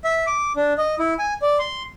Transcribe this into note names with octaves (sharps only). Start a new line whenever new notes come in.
E5
D6
D4
D#5
E4
G#5
D5
C6